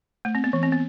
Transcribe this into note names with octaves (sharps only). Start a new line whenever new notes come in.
A3
C4
B3
E3
C4
B3